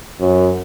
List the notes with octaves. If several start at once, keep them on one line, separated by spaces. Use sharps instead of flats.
F#2